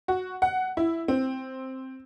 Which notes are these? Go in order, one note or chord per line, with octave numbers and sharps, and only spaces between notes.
F#4
F#5
E4
C4